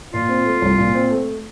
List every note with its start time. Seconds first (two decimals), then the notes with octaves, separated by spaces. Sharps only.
0.13 A#2 F4
0.29 C4
0.45 A3
0.62 C2
0.78 A#2
0.94 C4
1.10 A3